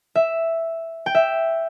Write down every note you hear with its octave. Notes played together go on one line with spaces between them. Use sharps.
E5
G5
E5